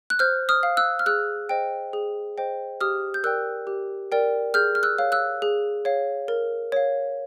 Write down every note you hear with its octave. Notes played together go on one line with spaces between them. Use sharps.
F#6
C5 F6 G6
D#6 F6
F5
E6 F#6
F6
G#4 E6 F#6
C5 D#5 G5
G#4
C5 D#5 G5
G4 D#6 F6
G6
A#4 D5 G5 E6 F#6
G4
A#4 D5 G5
G#4 F6 G6
F6
E6 F#6
C#5 F5
E6 F#6
G#4
C#5 F5
A#4
C#5 F5